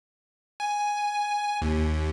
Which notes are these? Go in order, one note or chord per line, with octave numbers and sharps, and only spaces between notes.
G#5
D#2